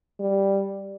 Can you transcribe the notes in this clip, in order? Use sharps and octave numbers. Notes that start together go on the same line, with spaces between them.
G3